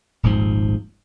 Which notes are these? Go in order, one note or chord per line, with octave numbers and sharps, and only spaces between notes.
D#1 G#1 G#2 F3